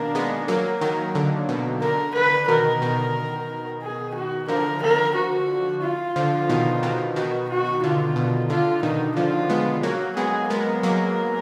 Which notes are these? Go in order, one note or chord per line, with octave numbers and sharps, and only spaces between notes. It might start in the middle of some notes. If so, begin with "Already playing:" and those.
Already playing: B2 D#3 A#3 D4 A#4
G#3 B3
F#3 A#3 A#4
D#3 F#3 A#4
D3
B2
D3 A#4
D3 B4
B2 D#3 A#4
B2 D#3
G#4
F#4
D3 F3 A#4
A#4
F#4
F4
D3 F3
B2 D#3
B2 D#3
B2 D#3 F#4
F#4
D3 F4
B2
D3 F4
B2 D#3 D#4
D3 F3 F4
G#3 B3
F#3 A#3 F#4
G#3 B3 G#4
G#3 B3 A#4
F#3 A#3